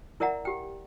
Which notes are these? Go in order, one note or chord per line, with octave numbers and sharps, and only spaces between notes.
E4 A#4 D5 E5 F#5 A#5
G4 G5